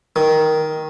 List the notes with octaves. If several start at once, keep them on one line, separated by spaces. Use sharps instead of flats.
D#3